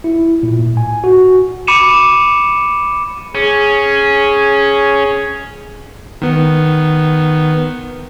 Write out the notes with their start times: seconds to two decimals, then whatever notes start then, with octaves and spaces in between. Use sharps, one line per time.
0.04 E4
0.43 A#2
0.59 A2
0.77 G#5
1.04 F#4
1.67 B5 D6 C#7 D#7 E7
3.35 C#4 G#4
6.22 D#3 B3